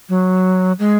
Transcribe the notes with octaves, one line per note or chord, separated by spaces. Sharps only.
F#3
G#3